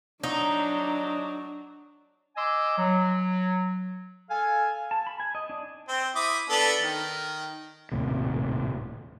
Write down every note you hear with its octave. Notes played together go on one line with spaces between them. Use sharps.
F#3 D4 D#4
D#5 G#5 C6 D6 E6
F#3
A4 F5 G#5
A5
B5
G#5
D#5
D4
C4
E4 D6 D#6
B3 D4 A4
D#3
D#1 G#1 A2 C3